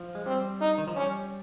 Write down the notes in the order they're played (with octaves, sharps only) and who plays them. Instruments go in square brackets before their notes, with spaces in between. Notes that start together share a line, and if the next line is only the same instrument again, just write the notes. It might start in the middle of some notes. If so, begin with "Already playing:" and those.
Already playing: [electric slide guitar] F3
G#3
[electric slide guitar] G3 [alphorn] C4
[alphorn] D#4
[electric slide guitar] D#3
F3
[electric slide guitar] G3 [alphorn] C#4